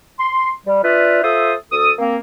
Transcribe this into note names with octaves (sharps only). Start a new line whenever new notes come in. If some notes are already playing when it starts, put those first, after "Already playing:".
C6
G3
D4 F4 B4 D5 E5
F4 A4 C5 E5 D#6
D2 A4 D#6
A#3 C4